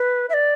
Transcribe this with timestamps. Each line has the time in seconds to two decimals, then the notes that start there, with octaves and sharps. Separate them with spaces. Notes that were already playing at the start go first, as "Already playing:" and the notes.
Already playing: B4
0.30 E5
0.34 D5